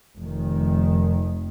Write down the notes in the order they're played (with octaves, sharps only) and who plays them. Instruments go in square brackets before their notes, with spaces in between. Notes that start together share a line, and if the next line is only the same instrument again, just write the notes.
[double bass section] F1 D#3